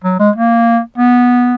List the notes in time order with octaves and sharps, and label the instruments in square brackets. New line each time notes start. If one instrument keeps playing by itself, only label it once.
[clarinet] F#3
G#3
A#3
B3